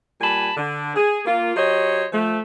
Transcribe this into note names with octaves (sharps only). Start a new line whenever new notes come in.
A#2 G3 G#5 A5 B5
D3
G#4
A#3 F4
F#3 G4 C5 C#5 D#5
F3 A3